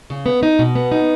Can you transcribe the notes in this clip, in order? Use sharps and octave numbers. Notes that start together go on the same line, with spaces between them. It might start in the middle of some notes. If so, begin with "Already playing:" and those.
C#3
B3
D#4
B2
B3
D#4